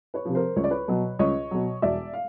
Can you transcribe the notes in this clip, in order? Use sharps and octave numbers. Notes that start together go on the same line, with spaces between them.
B4 C#5
C3 F3
A#4 C5
C#2 C#5
D5
B4 C#5
B2 F#3
C#2 C#5 D#5
B2 F#3
E1 D5 E5
F5